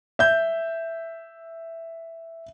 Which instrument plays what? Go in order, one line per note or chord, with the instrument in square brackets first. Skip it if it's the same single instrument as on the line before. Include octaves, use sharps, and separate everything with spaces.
[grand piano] E5 G6